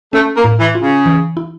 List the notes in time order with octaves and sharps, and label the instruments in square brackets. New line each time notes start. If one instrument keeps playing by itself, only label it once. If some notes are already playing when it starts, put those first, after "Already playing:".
[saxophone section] A3 [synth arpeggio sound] C#4
[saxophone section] A#3
[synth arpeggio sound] A2
[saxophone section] E3
[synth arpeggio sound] F4
[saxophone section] C#3
[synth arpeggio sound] E3
E4